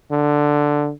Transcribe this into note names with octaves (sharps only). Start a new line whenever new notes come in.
D3